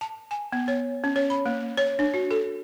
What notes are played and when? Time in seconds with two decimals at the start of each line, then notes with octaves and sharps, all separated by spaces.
0.01 A5
0.31 G#5
0.52 B3
0.68 C#5
1.04 C#4
1.16 C#5
1.30 B5
1.46 A#3
1.77 C#5
1.99 D4
2.14 F#4
2.31 A4